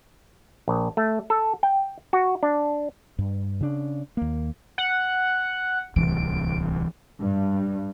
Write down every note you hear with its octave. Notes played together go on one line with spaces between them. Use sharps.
A#1
A3
A4
G5
F#4
D4
G2
C#3 D4
D#2 A#3
F#5
D1 C2 E3 D7
G2